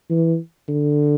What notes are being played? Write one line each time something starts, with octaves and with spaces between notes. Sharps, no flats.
E3
D3